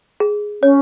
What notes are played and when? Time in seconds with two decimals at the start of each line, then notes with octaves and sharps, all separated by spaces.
0.20 G#4
0.63 C#4 C#5